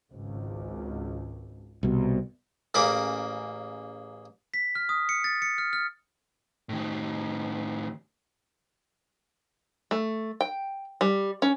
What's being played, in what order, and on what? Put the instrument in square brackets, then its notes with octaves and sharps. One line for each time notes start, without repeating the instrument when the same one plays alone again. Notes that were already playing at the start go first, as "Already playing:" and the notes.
[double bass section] G#1 C#2
[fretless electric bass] C2 B2
[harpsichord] A1 C#3 A#3 B5 D6
[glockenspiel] B6
F6
D#6
C#7
A6
C#7
F6
F6
[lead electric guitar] A2 D#3
[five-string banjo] A3
G5
G3
C#4